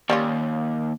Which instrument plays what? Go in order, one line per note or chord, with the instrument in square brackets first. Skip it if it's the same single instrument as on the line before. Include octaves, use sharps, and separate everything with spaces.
[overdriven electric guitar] D#2 [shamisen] G3 C#4 F4